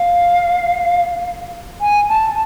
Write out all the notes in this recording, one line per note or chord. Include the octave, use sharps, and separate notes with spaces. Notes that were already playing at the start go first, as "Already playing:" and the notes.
Already playing: F5
G#5
A5